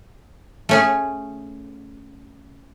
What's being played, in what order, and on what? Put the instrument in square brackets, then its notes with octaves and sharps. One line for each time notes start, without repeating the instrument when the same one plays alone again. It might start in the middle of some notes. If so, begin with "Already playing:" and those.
[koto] A3 C#4 G#4